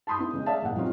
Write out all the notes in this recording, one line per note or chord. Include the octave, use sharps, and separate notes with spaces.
A5 B5 C6 D#6 G6
B3 D4 E4
C#3 G#3
G#4 D5 E5 F5 A5
F#1 A#2 F#5
F3 F#3 C4 C#4 D#4 F4